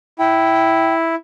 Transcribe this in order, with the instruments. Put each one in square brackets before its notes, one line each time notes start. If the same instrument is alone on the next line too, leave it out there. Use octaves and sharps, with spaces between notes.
[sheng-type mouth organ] E4 [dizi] G5